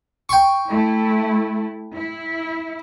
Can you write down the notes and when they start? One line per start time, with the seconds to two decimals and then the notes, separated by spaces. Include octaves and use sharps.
0.29 G5 C6 C#6
0.68 A3 E4
1.94 E4